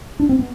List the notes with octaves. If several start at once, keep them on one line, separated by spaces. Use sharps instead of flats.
D4
C4
B3